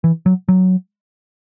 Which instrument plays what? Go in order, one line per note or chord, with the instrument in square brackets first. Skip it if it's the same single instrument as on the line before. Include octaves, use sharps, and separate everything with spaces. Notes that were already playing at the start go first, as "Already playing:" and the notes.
[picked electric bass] E3
F#3
F#3